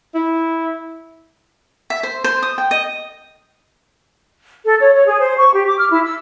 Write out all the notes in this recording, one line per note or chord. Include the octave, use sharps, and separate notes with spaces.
E4
E5
C5
C5
D#6
G5
D#5
A4
C#5
C#5
G#4
C5
C#6
G4
D6
F6
E4
E6